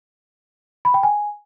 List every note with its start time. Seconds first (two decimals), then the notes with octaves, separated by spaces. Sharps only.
0.85 B5
0.94 G5
1.03 G#5